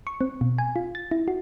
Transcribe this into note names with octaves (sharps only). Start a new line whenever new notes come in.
C#6
C4
B2
G#5
F4
A6
E4
F#4